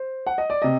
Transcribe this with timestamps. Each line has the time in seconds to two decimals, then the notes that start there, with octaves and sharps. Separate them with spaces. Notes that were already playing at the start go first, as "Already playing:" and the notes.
Already playing: C5
0.27 F#5
0.38 D#5
0.50 D5
0.62 C3 D#5